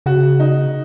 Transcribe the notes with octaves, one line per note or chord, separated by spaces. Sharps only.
C#3 F#4
D#4